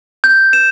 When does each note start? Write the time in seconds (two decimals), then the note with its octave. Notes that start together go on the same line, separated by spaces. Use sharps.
0.24 G6
0.53 E7